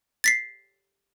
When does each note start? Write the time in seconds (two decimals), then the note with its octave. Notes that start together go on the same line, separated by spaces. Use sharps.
0.24 A6 B6 C7